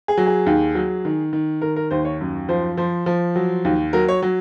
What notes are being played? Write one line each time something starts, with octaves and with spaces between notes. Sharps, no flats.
G#4
F#3
G#4
D#2
F#3
D#3
D#3
D#3 A#4
A#4
D#2 C5
C#5
F#2
F3 C5
F3 C5
F3
F#3
D#2
F#3 A#4
C#5
F#3